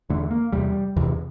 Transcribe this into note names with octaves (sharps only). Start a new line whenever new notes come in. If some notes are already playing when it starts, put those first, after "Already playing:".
E2 D3 A3
A#3
E2 C3 G3
E2 C3 E3